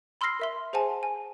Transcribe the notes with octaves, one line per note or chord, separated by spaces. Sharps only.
B5 C6 E6 F6 A#6 C7
A#4 E5 C6
G#4 C5 F#5 G#5 A5
G#5